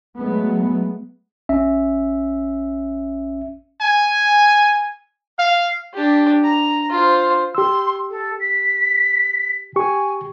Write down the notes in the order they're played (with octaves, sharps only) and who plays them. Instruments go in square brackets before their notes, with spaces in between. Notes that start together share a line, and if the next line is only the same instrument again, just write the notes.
[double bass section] F#3 G#3 A3 B3
[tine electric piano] A1 C#4 E5
[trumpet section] G#5
F5
[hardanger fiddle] D4 G4
A#5
F4 C5
[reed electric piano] G4 E6 [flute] C6
[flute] A4
B6
[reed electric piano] G4 C#6 [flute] G#5